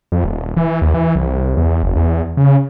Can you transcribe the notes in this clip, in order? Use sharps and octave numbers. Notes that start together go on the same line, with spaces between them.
F2
D#1
E3
D#2
E3
C2
E2
F#1
E2
C#3